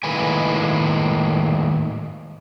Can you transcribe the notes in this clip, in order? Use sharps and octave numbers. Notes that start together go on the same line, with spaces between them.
A2 D#3 G#3 A#3 B4 G#5